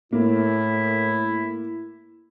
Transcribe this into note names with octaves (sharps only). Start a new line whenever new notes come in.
A2 A#3 E4